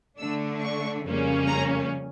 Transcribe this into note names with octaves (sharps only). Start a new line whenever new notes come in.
D3 A3 D4 E6
C#6
F2 C#3 G3 A#3 C#4
A#5